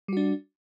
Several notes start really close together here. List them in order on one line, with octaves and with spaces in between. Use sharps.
G3 F#4 D4